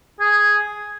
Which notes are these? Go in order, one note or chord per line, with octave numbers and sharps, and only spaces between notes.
G#4